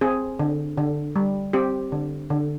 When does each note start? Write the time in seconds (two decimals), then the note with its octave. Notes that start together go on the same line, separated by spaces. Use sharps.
0.01 C4 G#4
0.39 D3
0.77 D3
1.16 G3
1.53 C4 G4
1.92 D3
2.30 D3